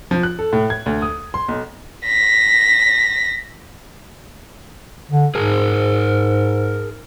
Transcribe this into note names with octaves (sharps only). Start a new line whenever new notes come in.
F3
F#6
A4
A2
G#6
D2
D#6
C6
B1
A#6 B6
D3
G#2 G#4 A#4